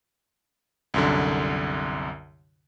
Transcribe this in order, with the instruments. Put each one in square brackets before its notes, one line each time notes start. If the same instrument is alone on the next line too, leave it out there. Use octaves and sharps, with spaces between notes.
[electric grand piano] C2 F#2 D3